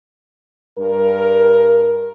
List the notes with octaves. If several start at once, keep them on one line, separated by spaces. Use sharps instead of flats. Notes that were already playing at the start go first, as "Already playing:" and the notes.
G2 A#4